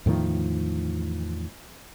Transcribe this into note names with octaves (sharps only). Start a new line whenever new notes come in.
E2 A2 D#3 F3